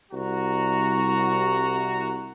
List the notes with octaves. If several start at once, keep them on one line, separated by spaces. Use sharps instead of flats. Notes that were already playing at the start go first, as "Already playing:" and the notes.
C2 F#4 A#5